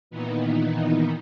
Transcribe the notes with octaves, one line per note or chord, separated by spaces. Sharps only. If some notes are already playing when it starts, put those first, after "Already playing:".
A#2 D#3 E3 B3 D#4